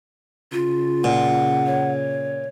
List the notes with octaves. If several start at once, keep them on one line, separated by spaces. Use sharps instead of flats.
C#3 F4
A#2 F#5
C#5